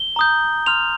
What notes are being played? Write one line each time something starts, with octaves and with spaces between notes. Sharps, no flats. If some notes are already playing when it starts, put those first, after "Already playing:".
Already playing: G7
A#5 D#6 G6
C6 F6 F7